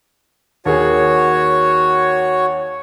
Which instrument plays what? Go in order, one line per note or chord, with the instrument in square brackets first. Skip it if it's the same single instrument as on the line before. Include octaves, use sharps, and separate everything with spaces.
[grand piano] D#2 G#4 [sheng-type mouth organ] F#4 C#5